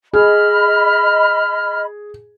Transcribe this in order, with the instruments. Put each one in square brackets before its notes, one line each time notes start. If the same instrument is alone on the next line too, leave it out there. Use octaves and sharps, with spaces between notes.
[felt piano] G#4 [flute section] D#5 B5 [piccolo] F6